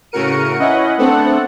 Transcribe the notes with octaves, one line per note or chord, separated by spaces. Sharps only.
A2 C#3 F#4 A#4 C#7 D#7
C#4 E4 B4 D#5 F#5
A3 B3 C4 D4 A4 F#5